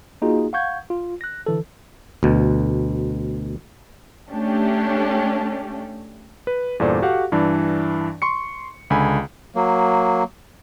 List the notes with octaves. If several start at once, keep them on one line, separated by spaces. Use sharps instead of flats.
A#3 D#4 F4 F#4 G#4
F5 F#5 C#6 G6 G#6
F4
F#6 A#6
D3 E3 A4
D2 B2
A3 C#4 D4 G4
B4
E2 G2 A#2 A4 C5 D5
F#4 G4 A4 F5 F#5
G2 E3 D4
C6 C#6 C#7
C#2 D3 G#5 B5
F#3 A#3